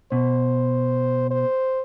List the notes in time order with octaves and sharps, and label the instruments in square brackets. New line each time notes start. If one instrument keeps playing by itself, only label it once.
[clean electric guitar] B2 [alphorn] C5
[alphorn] C5